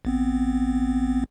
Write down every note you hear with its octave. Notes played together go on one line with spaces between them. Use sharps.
A1 B3 C4